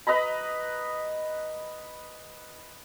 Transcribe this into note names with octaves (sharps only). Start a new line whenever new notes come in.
B4 D#5 A#5 B5